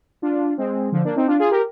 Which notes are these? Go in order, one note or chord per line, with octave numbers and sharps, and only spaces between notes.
D4 F4
G#3 C4
D3 F3
A#3 D4
C4 D#4
D4 F4
F4 G#4
G4 A#4